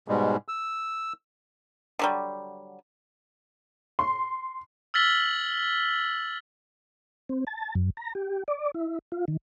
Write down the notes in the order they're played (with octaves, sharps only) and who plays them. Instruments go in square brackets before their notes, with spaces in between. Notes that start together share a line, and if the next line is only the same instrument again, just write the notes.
[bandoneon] G#2 B2 G3 G#3
E6
[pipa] D3 F#3 G3
[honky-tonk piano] C6
[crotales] E6 F6 A6 B6 F#7 G7
[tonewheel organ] C4
A5
F#2
A#5
G4
D5
E4
F4
D#3